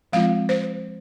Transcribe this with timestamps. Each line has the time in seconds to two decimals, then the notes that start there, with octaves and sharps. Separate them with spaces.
0.13 F3 G#3 C4 F4 F5
0.49 C5